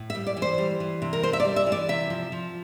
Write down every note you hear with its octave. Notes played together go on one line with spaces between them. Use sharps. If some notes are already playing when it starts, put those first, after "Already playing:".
Already playing: A2
E5
G3
D5
E3
C5
G3
E3
C3
A#4
C3 C5
E5
D5
G3
E5
E3
D5
C3 E5
F3
F3